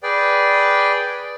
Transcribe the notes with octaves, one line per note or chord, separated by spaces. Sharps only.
G#4 B4 D5 G5